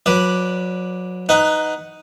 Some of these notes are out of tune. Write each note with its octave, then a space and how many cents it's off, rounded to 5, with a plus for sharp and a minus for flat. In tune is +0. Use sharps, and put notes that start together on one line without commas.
F#3 -30 B4 -10 D5 +0
D#4 +0 B4 +15 F#5 +0